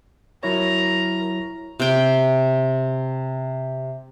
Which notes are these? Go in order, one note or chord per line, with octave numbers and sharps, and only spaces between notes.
F#3 E4 A#4 C#5 A#5
C3 G5